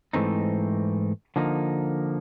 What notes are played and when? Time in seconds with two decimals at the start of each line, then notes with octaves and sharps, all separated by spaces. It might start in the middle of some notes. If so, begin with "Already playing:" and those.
0.13 G#2 E3 A3 C4 D#4
1.36 D3 F3 A#3 D#4